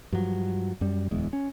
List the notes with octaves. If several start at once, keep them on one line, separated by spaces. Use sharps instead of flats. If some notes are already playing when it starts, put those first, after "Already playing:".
G2 F3 F#3
F#2 G3
D1 E2 G#3
C#4